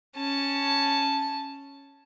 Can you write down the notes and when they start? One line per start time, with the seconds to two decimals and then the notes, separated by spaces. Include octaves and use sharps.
0.17 C#4 A5